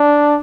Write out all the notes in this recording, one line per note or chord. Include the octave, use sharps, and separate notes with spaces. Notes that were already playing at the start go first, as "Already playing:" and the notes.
Already playing: D4